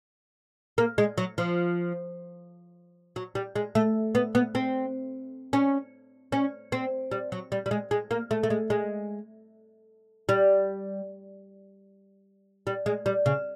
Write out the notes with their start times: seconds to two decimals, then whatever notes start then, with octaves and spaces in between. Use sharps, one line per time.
0.78 A#3
0.98 G#3
1.18 F#3
1.38 F3
3.16 F#3
3.35 G3
3.56 G#3
3.75 A3
4.15 B3
4.35 B3
4.55 C4
5.53 C#4
6.32 C#4
6.72 C4
7.11 G3
7.32 F#3
7.52 G3
7.66 G3
7.71 G#3
7.91 G#3
8.11 A#3
8.31 A3
8.43 A3
8.50 G#3
8.70 G#3
10.29 G3
12.67 G3
12.86 G#3
13.06 G3
13.26 C#3